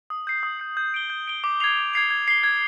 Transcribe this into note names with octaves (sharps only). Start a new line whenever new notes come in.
D#6
G6 C7
D#6
G6 C7
G6
D7 G7
G6
D7 G7
D6
G#6 C7 F7
D6
G#6 C7 F7
G#6
C7 G7
G#6